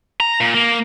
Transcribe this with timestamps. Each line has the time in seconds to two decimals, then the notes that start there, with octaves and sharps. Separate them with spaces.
0.20 A#5
0.41 A#2
0.54 A#3